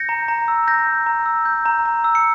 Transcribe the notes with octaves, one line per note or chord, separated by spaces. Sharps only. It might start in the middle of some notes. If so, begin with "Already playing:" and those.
Already playing: G6 A#6 C#7
A#5
A#5
E6
G6 A#6
A#5
A#5
E6
G6
A#5
A#5
E6
C#7